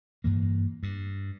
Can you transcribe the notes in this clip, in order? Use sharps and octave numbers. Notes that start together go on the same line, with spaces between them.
G2 E3 A#3
G2